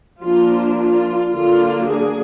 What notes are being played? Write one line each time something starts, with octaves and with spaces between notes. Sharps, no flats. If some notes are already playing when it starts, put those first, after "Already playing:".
F3 A#3 D4 F4
F4
D3 F#3 A#3 D4 F4
G#4